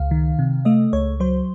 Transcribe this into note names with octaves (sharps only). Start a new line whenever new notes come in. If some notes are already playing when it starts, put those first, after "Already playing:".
Already playing: C#2 F5
D#3
C3
A3 D#5
C#2 C#5
F#3 C5